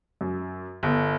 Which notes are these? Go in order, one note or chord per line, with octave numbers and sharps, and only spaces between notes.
F#2
G1